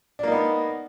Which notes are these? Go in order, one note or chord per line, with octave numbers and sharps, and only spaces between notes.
A#3 B3 D4 D#4